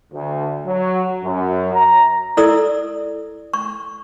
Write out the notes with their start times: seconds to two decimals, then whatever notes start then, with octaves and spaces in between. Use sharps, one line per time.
0.12 D2
0.65 F#3
1.23 F#2
1.74 A#5
2.37 E4 A4 D5 D#6 E6
3.54 C#6